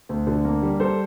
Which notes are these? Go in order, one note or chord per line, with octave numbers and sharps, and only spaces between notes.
D2
D3
A#3
G3
G3 A4 C5